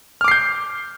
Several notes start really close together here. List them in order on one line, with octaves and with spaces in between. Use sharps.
F6 D6 C7 G6